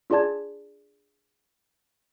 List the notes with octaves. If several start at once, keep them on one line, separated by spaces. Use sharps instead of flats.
D4 F4 G#4 D5 A5 G#6